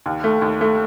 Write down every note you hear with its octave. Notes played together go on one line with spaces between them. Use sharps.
D#2
A3
D#2
A3